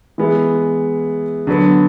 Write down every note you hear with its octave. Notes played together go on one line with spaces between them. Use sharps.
E3 G#3 B3 E4
D3 F#3 B3